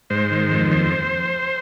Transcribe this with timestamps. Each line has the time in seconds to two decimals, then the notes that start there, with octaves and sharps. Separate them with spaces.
0.10 G#2 C5
0.31 D#3
0.52 F2
0.71 D#2 C5